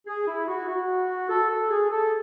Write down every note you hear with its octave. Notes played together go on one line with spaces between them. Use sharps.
G#4
E4
F#4
F#4
A4
A4
G#4
A4